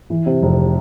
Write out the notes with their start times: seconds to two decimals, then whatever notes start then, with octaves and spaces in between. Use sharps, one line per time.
0.10 E3
0.26 C3
0.42 F1